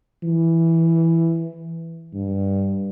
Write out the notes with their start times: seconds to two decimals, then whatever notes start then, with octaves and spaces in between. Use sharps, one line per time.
0.23 E3
2.14 G2